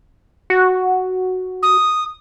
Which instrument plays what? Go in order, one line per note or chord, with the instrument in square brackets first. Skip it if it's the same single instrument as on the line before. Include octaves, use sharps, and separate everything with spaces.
[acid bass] F#4
[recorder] D#6